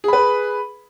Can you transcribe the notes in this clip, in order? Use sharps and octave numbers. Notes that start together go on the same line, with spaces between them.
G#4 B4 B5